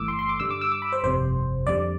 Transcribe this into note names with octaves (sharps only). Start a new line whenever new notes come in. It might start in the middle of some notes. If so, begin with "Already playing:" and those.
Already playing: G1 G2 E3 A3 D6 E6
C6
C6
D6
G2 D3 G3 E6
D6
E6
D6
B5
C5
G1 F2 C3 G3 C5
F2 D3 G3 D5